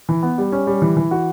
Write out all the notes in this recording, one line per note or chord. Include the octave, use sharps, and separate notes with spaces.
E3
B3
G3
C#4
G3
E3
E3
F#4